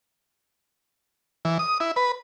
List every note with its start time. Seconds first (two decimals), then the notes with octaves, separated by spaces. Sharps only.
1.45 E3
1.59 D#6
1.80 E4
1.96 B4